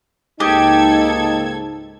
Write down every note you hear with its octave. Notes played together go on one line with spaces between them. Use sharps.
C#2 G#2 A#3 D#4 G4 A4 D#5 G#6